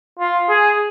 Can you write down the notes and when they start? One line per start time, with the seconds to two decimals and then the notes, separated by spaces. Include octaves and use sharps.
0.19 F4
0.49 G#4